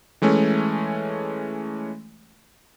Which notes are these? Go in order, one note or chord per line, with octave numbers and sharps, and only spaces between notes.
E3 G#3 A3 C#4